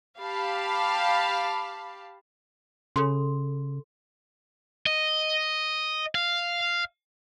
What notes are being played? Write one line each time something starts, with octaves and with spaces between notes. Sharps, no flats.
G4 F5 A5 B5
C#3 A4 B5 C6
D#5
F5